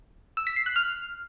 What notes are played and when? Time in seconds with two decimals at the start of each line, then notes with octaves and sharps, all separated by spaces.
0.37 E6
0.47 B6
0.56 C7
0.66 F#6
0.76 F6